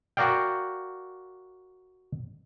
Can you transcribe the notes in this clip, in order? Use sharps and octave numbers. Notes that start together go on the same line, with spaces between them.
F#4 A#4 D5 F5 G5